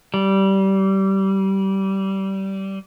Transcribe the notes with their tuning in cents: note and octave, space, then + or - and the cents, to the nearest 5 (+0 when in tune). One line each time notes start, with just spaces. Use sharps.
G3 -20